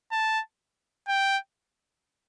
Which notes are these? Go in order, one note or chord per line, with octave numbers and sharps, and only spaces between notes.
A5
G5